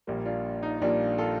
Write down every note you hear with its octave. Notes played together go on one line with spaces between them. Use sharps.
A#1 A#2 G3 A#3
D4 F4
D#4
A#1 A#2 G3 A#3 D4
F4 A4